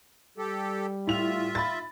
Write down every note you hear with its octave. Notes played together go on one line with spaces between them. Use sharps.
G3 G4 A4
A2 F4 E5 F7
B5 A6